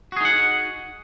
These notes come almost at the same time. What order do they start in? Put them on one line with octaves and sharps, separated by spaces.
F#4 G#4 D#4 F#5